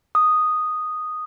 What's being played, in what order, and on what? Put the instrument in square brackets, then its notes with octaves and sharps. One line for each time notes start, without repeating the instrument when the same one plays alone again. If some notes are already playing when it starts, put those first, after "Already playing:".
[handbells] D#6